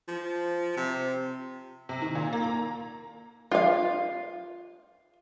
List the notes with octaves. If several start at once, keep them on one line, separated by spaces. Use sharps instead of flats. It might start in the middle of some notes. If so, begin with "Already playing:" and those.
F3
C3
C3
D#3
A#2
A#3
A#5
F4 F5